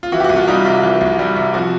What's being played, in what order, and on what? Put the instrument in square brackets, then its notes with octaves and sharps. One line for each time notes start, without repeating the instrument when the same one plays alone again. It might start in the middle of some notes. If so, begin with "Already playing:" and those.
[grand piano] F4
E3 F#4
G4
F#4
C2
F4
G3 D#4
C3 F4
E3
C2
G3
C3
F3 F#4